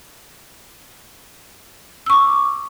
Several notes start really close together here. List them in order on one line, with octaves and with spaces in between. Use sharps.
E6 C#6 D6